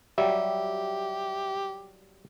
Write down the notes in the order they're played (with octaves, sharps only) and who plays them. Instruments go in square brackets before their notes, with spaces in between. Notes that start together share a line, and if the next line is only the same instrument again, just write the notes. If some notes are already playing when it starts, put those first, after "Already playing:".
[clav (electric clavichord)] F#3 G3 [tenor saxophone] G4 [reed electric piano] E5